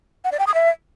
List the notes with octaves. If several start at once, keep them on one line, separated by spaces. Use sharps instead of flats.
F#5
D5
G5
D#6
E5